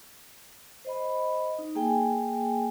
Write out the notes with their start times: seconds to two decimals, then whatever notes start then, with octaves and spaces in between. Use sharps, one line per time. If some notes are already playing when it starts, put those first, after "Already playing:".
0.85 C5 D#5 B5
1.58 D#4
1.75 A#3 G#4 G5 G#5